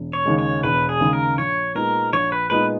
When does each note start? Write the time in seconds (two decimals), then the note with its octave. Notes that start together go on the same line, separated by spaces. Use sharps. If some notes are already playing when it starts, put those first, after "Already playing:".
Already playing: E1
0.13 C#5
0.26 D#2 C#3 G#3
0.39 C#5
0.63 E1 B4
0.89 G#4
1.01 D#2 C#3 G#3
1.13 A#4
1.38 A#1 C#5
1.75 A#2 G#3 B3 D#4 A#4
2.13 A#1 C#5
2.32 B4
2.50 A#2 G#3 B3 D#4 B4